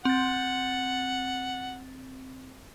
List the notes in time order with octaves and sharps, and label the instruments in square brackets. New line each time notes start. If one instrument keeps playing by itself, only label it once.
[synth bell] C4 A6 [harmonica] F#5